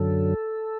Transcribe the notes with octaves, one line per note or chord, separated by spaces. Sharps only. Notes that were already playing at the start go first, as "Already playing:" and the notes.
Already playing: F#2 D3 F#3 A4